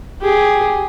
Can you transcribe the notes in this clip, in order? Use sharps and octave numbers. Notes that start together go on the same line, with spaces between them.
G4 G#4